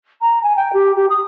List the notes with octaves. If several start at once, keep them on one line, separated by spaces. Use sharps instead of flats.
A#5
G#5
G5
G4
G4
D#6